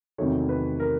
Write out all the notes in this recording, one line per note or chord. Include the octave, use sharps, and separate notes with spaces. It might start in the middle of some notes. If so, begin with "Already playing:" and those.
E2 C3 D#3 F#3 A3 C#5
B4
A#4